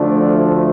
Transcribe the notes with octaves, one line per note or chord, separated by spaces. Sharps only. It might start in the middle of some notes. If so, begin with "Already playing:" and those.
Already playing: D2 D3 F3 A3 D4